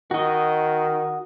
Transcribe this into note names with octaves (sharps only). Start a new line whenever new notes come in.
D#3 F#4 D#5